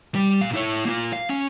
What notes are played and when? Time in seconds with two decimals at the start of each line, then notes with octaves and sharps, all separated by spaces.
0.15 G3
0.41 A#2 F5
0.54 E4 C#5
0.85 A#3 F4
1.13 F5
1.30 C#4